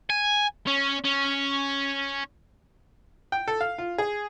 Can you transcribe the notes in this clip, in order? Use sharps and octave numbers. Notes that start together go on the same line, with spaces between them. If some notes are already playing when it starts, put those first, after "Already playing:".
G#5
C#4
C#4
G5
A4
F5
F4
G#4